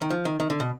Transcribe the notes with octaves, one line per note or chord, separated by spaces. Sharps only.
D#3
F3
D#3
D#3
D3
B2